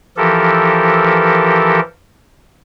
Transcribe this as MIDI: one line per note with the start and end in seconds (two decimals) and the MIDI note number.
0.17 1.80 52
0.17 1.80 53
0.17 1.80 67
0.17 1.80 69
0.17 1.80 70